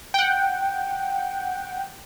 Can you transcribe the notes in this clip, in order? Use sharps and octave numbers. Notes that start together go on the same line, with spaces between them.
F#5 G5